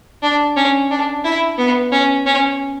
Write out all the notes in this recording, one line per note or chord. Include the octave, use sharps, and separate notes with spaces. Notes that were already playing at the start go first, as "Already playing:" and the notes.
D4
C#4
D4
E4
B3
C#4
C#4